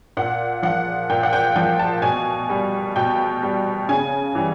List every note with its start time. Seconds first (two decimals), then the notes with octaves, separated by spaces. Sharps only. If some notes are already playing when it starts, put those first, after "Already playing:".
0.17 A#2 F#5
0.63 F3 F#5
1.10 A#2 G5
1.23 F#5
1.33 G5
1.56 F3 G5
1.79 A5
2.02 B2 G#5
2.50 G3
2.96 B2 G5
3.43 G3
3.89 C#3 G#5
4.35 E3 G3